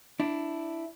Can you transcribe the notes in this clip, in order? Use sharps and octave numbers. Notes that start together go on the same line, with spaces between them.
D4 E4